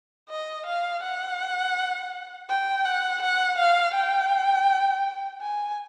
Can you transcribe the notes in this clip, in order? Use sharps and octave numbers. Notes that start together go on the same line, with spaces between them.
D#5
F5
F#5
G5
F#5
F#5
F5
G5
G#5